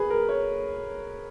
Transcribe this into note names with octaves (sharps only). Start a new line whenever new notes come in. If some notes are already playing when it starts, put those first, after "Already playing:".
Already playing: G#4 B4
A#4
C#5